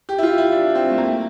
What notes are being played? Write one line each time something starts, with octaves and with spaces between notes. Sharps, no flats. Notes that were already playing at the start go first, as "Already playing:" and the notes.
G4
E4
F4
E4
D4
C4
A3
A#3